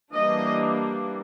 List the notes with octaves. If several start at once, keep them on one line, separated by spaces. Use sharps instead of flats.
E3 G3 A#3 D4 D#5